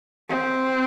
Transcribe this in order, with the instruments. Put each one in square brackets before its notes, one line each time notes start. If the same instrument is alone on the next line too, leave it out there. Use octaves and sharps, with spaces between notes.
[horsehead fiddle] C4